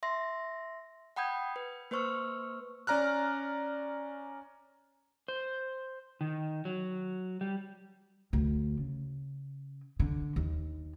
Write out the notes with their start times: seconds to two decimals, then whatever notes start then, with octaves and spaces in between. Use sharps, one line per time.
0.03 E5 C6 A#6
1.16 F#5 G5 B5 D#6 G6 G#6
1.56 B4
1.91 A#3 B4 C5 C#6 E6 F6
2.87 C#4 D5 A#5 F6 F#6
5.28 C5
6.21 D#3
6.65 F#3
7.41 G3
8.33 D2
8.77 C#3
10.00 D3
10.36 D#2